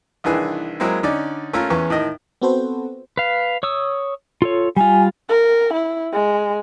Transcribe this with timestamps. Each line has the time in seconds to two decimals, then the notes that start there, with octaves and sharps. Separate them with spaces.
0.24 C2 D#3 E3 D4 G#4 B4
0.80 F#3 G#3 A#3 C4 E4
1.03 D3 C#4 D#4 D5
1.53 A3 A#3 C#4 F4 A#4
1.70 E2 E3 B3 C#4 C#6
1.90 A2 D#3 D#5
2.42 B3 C4 F#4 A4 B4 C5
3.17 B4 F5
3.63 C#5 D#6 E6
4.42 F4 A4 C#5
4.77 G3 F4 G#5
5.29 A#4
5.73 E4
6.13 G#3